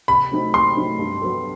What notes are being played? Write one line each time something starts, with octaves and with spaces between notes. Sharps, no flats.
C3 B5
F#3 A3 C4 D#4
C3 C6
F#3 A3 C4 D#4
G2
F#3 B3 F#4 A4